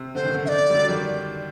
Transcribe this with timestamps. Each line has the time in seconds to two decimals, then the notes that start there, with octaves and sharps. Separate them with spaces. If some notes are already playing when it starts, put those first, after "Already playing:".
Already playing: C3
0.15 D3 C5
0.25 D#3
0.34 D3
0.44 D3 E5
0.48 D5
0.70 G3
0.74 D3 F#3
0.89 D#3 G3